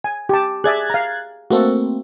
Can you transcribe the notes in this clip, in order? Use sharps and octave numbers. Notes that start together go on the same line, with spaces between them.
G#5
G4 A5
G#4 D5 E5 F#6 G#6 A6
F5 A#5
A3 A#3 C4 F#4 A4